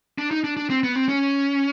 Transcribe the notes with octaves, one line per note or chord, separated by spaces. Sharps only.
D4
D#4
D4
D4
C4
B3
C4
C#4